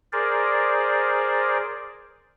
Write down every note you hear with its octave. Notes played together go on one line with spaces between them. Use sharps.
G#4 A#4 C5 D5